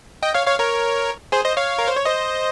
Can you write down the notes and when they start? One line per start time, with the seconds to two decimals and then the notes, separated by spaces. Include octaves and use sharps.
0.23 D#5 G5
0.34 C#5 F5
0.47 C#5 F5
0.59 A#4 C#5
1.32 G#4 C5
1.44 C5 D#5
1.57 C#5 F5
1.79 A#4
1.88 C5
1.97 C#5
2.05 C5 D#5